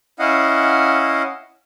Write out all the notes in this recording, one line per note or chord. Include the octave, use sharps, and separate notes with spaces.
C#4 E4 D#5 F5 F#5